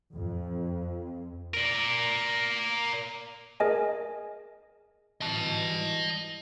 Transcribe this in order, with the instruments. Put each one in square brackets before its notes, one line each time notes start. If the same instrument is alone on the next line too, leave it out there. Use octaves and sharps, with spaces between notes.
[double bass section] F2
[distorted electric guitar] A#4 D5
[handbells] G#4 A#4 D#5 G#5
[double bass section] G#2 E3 G3 [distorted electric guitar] D#5 A5